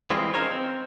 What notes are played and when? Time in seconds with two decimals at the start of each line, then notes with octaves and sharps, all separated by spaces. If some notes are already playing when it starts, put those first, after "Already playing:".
0.10 E3 G3 G#3 C4 E4 F4
0.34 C#4 D#4 A#4 C5 C#5
0.51 C4